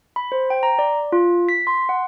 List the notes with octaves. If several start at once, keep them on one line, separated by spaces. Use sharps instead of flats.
B5
C5
G5
A#5
D5
F4
B6
C6
F#5